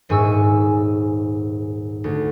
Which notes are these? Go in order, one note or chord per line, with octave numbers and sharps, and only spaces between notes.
D#1 G#2 G#5 C#6 E6
D2